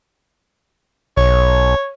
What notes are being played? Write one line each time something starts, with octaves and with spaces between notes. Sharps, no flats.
B1 C#5